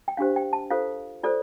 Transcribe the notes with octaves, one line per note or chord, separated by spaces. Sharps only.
G5
D4 G4 C5 F5
G5
A5
F4 A4 C5 F5
F4 A4 C5 D5